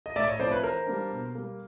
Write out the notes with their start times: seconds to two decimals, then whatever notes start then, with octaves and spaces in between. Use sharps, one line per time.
0.06 D#5
0.16 A2 D5 E5
0.28 C#5 D#5
0.40 F3 A3 C4 E4 C5 D5
0.51 B4 C#5
0.63 E3 A#4 C5
0.87 G3 A#3 D4
1.10 B2
1.35 G3 A#3